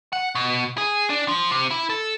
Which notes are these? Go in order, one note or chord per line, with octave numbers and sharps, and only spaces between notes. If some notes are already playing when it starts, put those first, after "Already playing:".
F#5
B2
G#4
D4
F3
C3
E4
A4